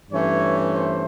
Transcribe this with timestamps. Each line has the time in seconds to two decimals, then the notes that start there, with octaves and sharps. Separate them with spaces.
0.11 G2 E3 A3 C#4 C#5
0.75 C5